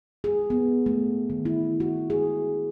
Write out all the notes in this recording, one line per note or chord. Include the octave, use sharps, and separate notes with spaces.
G#4
B3
A3
D#3
E4
F#4
G#4